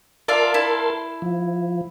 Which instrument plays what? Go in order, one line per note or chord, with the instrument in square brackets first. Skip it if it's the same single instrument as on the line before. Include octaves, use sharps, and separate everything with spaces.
[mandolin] F4 D5 E5 [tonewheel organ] A#4 A5 C6
[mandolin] E4
[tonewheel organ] F3